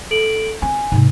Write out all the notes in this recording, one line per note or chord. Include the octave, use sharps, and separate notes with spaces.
A4 D7 F#7
C4 G#5
G#2 C3